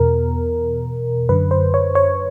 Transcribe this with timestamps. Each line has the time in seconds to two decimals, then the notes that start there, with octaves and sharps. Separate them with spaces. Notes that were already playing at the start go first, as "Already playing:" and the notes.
Already playing: E2 B2 A#4
1.29 F#2 D3 B4
1.51 C5
1.74 C#5
1.95 C#5